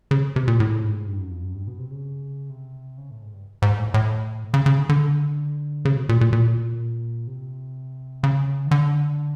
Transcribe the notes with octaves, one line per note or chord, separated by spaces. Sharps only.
C#3
C3
A#2
A2
G#2
G2
F#2
F2
F#2
G2
B2
C3
C#3
C3
C#3
A2
G#2
G2
G#2
A2
A2
C#3
C#3
D3
D3
C#3
B2
A#2
A#2
A#2
C3
C#3
D#3
D3